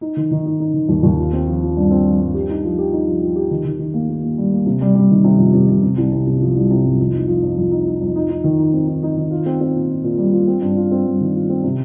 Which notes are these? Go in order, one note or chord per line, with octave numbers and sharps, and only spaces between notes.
D#4
D#3
D#3
D#4
D#4
D#3
D#2
D#2
F4
C4
F3
F4
G2
C4
F3
G2
G4
D#4
F3
G4
D#4
F3
F3
G4
D#3
D#3
D#3
A#3
A#3
A#3
G3
A#3
C3
G3
G3
D#3
C3
F2
C3
C3
C3
C2
C3
C3
F3
C2
C3
C2
F2
D#4
F3
F2
F2
D#4
D#4
F2
D#4
D#4
D#3
D#4
C4
D#4
D#4
D#3
F4
C4
C4
A#2
F4
A#2
G3
F4
C4
G2
F4
C4
G2
D#3
F4
C4
C3